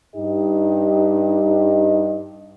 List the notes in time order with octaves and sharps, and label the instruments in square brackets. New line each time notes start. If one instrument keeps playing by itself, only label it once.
[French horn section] G2 D#4 G4 D#5